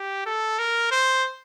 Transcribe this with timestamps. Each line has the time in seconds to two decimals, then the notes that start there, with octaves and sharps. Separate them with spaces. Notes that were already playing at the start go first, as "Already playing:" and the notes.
Already playing: G4
0.26 A4
0.59 A#4
0.91 C5